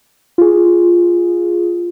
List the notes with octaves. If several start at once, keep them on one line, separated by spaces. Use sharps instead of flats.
F4 G#4